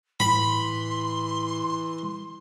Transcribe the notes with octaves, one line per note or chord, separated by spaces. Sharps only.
A2 E3 B5 C6